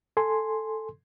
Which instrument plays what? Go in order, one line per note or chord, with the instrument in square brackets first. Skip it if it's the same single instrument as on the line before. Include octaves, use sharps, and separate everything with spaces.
[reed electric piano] A4 G#5 C6